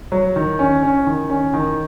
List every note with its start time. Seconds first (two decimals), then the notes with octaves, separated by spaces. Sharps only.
0.12 F#3
0.36 D#3
0.59 C#4
0.83 C#4
1.07 D#3
1.29 C#4
1.53 D#3